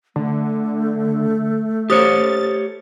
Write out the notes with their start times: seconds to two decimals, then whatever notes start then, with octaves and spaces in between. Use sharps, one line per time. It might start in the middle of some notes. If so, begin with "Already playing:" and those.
0.16 D3 A3
1.90 G4 A4 C5 C#5 D#6 A6